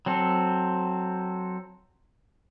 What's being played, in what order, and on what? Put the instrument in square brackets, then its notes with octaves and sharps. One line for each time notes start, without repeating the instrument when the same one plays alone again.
[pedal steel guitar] F#3 C4 A4